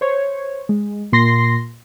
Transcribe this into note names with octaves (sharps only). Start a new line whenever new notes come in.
C5 C#5
G#3
A#2 C6 A#6 C7